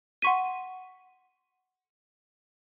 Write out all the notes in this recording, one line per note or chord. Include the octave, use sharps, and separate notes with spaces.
F#5 C6 C#6 B6 D#7